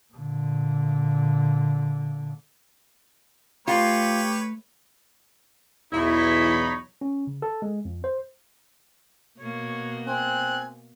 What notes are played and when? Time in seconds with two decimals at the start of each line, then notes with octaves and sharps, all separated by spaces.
0.14 A#2 D3
3.68 A3 F4 G4 B4 C#5
5.93 B1 E2 D#4 E4 C#5 B5
7.01 C#4
7.27 C#3
7.42 A4
7.62 G#3
7.85 F2
8.04 C5
9.40 B2 A#3 C#5
10.07 C4 G#5 F#6